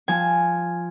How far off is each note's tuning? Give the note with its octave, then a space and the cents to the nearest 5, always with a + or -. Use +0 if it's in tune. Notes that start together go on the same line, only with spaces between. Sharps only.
F3 +0 G#5 +0